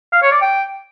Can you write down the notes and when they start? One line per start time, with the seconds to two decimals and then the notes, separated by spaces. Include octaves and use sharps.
0.13 F5
0.22 C#5
0.32 D5
0.42 G5